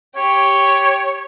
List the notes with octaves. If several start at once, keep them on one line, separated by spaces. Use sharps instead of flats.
G4 C#5